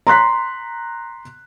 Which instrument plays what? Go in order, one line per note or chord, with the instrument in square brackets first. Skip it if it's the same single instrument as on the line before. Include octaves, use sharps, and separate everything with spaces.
[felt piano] A#5 C6 F#6 B6